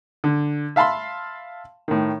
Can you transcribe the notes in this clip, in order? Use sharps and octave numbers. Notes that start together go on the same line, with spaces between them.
D3
E5 F5 A5 B5 C6
A2 D#3